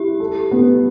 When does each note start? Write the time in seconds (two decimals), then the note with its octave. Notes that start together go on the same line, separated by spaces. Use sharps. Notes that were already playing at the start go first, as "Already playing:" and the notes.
Already playing: E4 G4
0.20 A4
0.52 B3